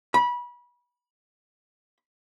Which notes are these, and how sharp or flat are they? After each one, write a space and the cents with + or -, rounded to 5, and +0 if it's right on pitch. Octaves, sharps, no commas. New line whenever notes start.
B5 -25